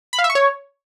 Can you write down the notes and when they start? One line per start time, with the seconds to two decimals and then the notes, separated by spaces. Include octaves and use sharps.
0.13 B5
0.19 F5
0.24 E5
0.30 C#6
0.35 C#5